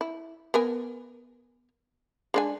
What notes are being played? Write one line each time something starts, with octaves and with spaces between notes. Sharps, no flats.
E4
B3 A#4 G#5
G#3 D4 G#5